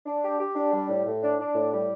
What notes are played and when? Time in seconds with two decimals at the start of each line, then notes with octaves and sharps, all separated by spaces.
0.06 D4
0.23 G4
0.39 G4
0.55 D4
0.72 G3
0.89 A2
1.06 A2
1.22 D4
1.39 D4
1.55 A2
1.72 G3